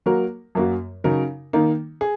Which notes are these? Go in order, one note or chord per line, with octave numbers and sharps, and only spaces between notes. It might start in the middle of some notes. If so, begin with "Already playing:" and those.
F#3 A#3 F#4 A#4
F#2 F#3 A#3 F#4
C#3 F#3 D#4 A#4
D#3 A#3 D#4
G#4